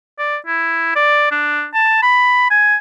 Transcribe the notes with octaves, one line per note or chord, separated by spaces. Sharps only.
D5
E4
D5
D4
A5
B5
G#5